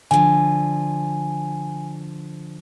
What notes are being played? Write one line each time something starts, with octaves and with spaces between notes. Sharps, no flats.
D3 F3 G#5